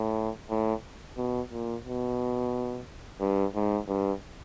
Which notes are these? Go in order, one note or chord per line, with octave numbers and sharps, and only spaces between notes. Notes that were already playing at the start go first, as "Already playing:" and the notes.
Already playing: A2
A2
B2
A#2
B2
G2
G#2
G2